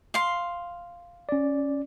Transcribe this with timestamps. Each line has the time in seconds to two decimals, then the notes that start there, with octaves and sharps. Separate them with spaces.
0.14 F5 C6
1.29 C#4 D5